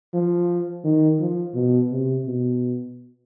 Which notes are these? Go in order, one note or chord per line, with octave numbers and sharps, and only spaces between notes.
F3
D#3
F3
B2
C3
B2